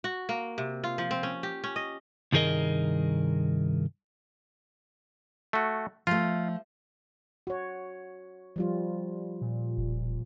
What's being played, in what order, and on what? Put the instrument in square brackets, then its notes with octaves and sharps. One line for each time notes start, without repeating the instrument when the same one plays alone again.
[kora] F#4
A#3
C3
F4
F3
C4
C#4
G4
C#4
D#5
[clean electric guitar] C2 G2 D#3 G#4 A#4 D#5
[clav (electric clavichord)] A3 F#4
[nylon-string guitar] F3 A3 [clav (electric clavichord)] F4
[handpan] F#4 C#5
F3 G3 F4
[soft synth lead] A#2
[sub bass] E1